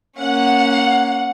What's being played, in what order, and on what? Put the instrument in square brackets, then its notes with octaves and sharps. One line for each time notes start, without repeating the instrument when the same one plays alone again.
[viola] A#3 C#4 [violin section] F#5